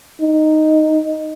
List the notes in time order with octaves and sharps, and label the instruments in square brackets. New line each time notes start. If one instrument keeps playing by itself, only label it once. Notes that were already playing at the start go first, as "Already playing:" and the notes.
[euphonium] D#4